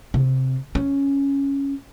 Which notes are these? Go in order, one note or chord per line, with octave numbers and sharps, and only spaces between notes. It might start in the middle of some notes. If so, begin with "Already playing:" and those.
C3
C#4